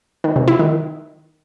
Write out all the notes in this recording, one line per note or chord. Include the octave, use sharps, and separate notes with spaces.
D#3
C3
E4
D#3